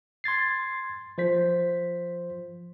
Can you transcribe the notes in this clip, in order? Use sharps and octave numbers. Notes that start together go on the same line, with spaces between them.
C6 G#6 A6 C7
F3 C5 B6